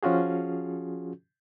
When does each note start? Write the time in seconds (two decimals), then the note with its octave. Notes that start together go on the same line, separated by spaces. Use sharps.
0.03 F3 C#4 F4 F#4 G#4